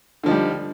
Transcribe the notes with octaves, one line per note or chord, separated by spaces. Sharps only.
D3 F3 G3 D#4